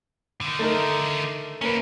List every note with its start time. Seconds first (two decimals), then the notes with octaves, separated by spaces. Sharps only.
0.41 D3 D#3
0.59 A3 D#4 A#4
1.61 A#3 C#4 E4 B4